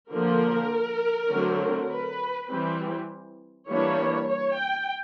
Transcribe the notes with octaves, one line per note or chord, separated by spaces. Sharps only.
D3 F3 A#3 A#4
D3 F#3 A3 C4
B4
E3 G3 C4
E3 G3 A#3 D4 C#5
C#5
G5